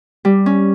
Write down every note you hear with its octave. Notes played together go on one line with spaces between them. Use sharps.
G3
C#4